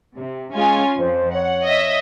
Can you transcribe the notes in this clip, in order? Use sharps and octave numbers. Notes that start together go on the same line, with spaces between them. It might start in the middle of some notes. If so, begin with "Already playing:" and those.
C3
G#3 C#4 F4 G#5
F2 C5
C#5 F#5
D#5 E5